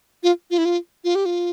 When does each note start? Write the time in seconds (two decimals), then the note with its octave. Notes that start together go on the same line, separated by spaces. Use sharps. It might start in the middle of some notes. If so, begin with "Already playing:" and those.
0.23 F4
0.51 F4
0.58 E4
0.65 F4
1.04 F4
1.15 G4
1.26 F4